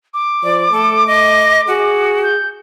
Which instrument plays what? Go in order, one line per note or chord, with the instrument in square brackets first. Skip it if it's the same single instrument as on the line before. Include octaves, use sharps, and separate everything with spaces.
[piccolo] D6
[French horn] F3 [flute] D5
[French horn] A3 [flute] A4
[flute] D#5
[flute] F#4 [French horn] G#4
[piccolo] G6